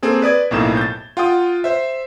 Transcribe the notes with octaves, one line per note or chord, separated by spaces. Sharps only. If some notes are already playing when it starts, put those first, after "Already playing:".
A#3 C4 G#4 A4
B4 D5 D#6 G#6
B1 F2 A2 A#3 D#4 E7
G6 A6
F4 F#5 G5 D#6
C5 E5